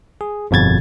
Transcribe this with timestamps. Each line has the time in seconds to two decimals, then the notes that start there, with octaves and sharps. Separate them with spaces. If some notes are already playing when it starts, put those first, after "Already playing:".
0.21 G#4
0.51 G1 F2 B2 G#6 A6